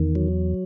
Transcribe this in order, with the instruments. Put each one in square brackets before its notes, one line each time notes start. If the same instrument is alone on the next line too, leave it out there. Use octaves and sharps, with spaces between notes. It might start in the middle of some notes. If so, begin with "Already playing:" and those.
Already playing: [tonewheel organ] E2 D#3
F#3